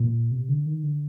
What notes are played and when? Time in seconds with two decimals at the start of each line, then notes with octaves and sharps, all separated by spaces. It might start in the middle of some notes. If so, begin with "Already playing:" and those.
Already playing: A#2
0.31 C3
0.49 D3
0.66 D#3
0.83 D3